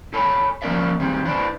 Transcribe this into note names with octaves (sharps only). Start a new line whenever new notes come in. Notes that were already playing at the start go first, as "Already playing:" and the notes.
A4 C#5 G#5 B5
F3 A#3 C#4 A#4 D5 E5
D#3 G3 C4
D4 E4 B4 C5 D5